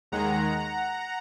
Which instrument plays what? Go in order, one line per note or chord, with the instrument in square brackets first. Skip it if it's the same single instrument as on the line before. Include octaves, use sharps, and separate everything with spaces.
[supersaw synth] D#2 D#3 G#3 F#5 A#5